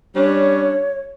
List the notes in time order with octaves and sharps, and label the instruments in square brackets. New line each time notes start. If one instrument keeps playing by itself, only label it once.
[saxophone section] G3 C#4 D4 [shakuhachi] C#5